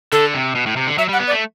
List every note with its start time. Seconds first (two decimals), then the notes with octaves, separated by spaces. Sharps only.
0.12 D3 A4
0.34 C3
0.55 B2
0.66 A2
0.76 C3
0.87 D3
0.98 F#3 E5
1.09 G3 F#5
1.20 B3
1.27 D5
1.31 A3